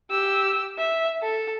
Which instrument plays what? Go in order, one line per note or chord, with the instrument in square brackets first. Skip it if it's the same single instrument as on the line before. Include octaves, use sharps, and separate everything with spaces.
[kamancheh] G4 E6
E5
A4